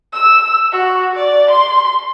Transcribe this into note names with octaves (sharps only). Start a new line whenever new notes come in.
E6
F#4
D5
C6